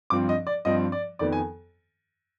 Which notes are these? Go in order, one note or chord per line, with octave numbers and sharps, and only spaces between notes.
G2 F3 C4 D6
D#5
D5
G2 F3 C4 D#5
D5
F2 D#3 B3 D5
G#5